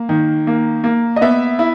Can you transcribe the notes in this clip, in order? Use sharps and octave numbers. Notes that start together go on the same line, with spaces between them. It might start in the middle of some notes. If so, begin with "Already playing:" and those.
Already playing: A#3
D#3
A#3
A#3
D#5
B3 E5
E4